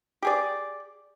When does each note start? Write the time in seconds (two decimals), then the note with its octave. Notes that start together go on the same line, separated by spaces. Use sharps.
0.22 G4 G#4 D5